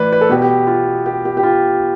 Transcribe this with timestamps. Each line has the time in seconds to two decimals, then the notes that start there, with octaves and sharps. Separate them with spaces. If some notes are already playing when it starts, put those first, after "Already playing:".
Already playing: A2 E3 B4 D5
0.12 B4
0.21 A4
0.29 B2 B3 G4
0.42 G4
0.67 F4
1.06 G4
1.25 G4
1.37 G4
1.43 F4